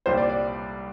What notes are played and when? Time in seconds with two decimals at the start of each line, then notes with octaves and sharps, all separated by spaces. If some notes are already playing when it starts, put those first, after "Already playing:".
0.06 C2 A#2 G3 C5
0.18 D5
0.30 D5